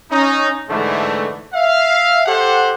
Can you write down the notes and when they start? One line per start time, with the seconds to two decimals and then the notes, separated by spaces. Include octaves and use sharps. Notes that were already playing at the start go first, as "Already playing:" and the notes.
0.11 C#4 D#4
0.69 G#2 D3 E3 A3
1.54 E5 F5
2.26 G4 A4 C5 F#5